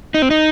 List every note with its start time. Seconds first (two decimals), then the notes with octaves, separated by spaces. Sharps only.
0.14 D#4
0.22 C4
0.30 D#4